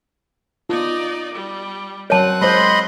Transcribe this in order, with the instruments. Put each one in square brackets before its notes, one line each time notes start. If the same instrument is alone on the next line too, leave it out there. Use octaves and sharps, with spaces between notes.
[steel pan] B3 F4 [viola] D#4 D5
[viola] G3
[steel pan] F#3 A#4 [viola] C4 F#5 [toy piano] C#5 A5
[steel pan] G#3 C5 [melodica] D#5 B5 C6